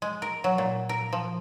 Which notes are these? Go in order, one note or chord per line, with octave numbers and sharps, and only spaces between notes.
G#3
A#4
F#3
A#2
A#4
F3